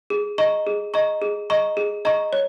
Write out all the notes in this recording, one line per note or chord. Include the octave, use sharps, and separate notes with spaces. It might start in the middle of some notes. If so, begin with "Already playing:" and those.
G#4
D#5 A#5 C#6
G#4
D#5 A#5 C#6
G#4
D#5 A#5 C#6
G#4
D#5 A#5 C#6
C#5